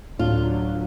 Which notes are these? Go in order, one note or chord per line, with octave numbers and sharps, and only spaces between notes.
D2 A2 D3 F#3 D4 F4